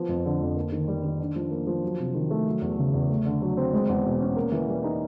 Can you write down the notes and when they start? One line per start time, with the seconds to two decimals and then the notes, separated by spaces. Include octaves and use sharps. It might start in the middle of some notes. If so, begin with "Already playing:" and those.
Already playing: F3 B3
0.09 F2
0.25 D3
0.41 F2
0.56 A#3
0.72 D#3
0.88 G3
1.04 D#3
1.20 D4
1.36 F3
1.51 A#3
1.67 F3
1.84 F#3
1.99 C3
2.15 D#3
2.30 A3
2.47 F#3
2.62 E2
2.78 C#3
2.94 E2
3.09 A3
3.25 D3
3.42 F#3
3.57 C4
3.73 G#3
3.89 E2
4.05 B2
4.21 C#4
4.36 A#3
4.52 E3
4.68 G3
4.84 D#4